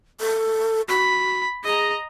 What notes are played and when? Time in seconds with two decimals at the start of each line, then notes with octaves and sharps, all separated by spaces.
0.21 A4
0.89 F#4 B5
1.65 G#4 D#5 A#5